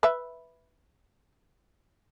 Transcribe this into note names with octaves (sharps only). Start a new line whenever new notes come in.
B4 E5